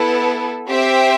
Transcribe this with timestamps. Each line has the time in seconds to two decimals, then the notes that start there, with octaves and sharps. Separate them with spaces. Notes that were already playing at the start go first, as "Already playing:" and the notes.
Already playing: B3 E4 A4
0.68 C4 G4 C5 E5 G5